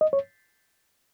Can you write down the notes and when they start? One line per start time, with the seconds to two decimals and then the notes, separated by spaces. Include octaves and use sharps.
0.01 D#5
0.13 C#5